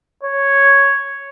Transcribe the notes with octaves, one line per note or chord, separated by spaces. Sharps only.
C#5